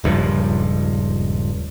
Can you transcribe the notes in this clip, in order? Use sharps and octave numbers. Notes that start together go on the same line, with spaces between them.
D#1 C#2 G2 F3